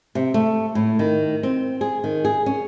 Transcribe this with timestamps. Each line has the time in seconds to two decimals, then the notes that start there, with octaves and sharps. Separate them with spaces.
0.15 C3
0.34 A3
0.75 A2
0.99 D#3
1.43 C4
1.81 G#4
2.04 D#3
2.25 G#4
2.46 C#4